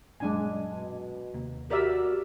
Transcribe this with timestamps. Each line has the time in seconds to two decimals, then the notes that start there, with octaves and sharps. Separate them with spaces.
0.20 F#2 A#2 G#3 D4 G#5
0.73 B2
1.34 D#2 C3 A#3
1.71 F#4 G4 A#4 D5 E5